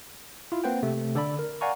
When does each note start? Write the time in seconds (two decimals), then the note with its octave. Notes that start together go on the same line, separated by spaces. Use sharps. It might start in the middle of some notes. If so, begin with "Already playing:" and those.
0.52 E4 F4
0.64 A#3 C4 B4 C5 F#5 G5
0.83 C3 A3
1.15 D3 A4 D5 B5
1.39 A#4
1.61 D5 F5 F#5 G#5 A#5 C#6